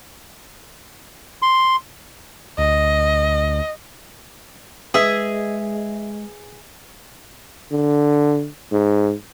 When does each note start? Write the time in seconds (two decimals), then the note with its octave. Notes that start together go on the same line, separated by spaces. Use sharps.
1.42 C6
2.58 D2 D#5
4.94 G#3 G#4 B4 D#5 E5
7.72 D3
8.72 G#2